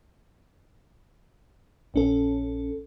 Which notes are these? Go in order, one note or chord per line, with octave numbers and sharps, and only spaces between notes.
A#1 C#4 A4